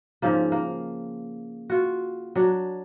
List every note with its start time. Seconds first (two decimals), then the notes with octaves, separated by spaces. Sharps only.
0.22 G#2 C#3 F3 A#3
0.52 A#3
1.70 F4 F#4
2.35 F#3 D4